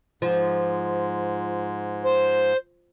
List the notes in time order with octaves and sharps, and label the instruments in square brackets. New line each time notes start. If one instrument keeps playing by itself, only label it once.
[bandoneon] G#2 [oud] F3
[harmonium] C5